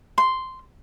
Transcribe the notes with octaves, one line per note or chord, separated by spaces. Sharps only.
C6